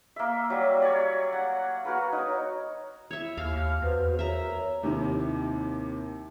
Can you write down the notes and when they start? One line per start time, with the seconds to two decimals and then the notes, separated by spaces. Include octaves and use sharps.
0.16 A#3 E5
0.50 F#3 G3
0.82 C#5 D5
1.33 F#5
1.85 F#4 A#4 B4
2.12 D#4 C#5
3.11 E4 C#5 E5
3.37 D#2 F5 F6
3.56 D#2
3.82 E2 F#4 B4 C5
4.19 A#4 C#5 E5 A#5
4.83 D#2 C3 D#3 E4